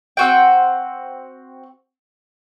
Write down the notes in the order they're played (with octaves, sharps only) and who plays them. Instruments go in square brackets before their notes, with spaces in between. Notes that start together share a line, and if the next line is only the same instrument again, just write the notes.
[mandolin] C4 F#4 G5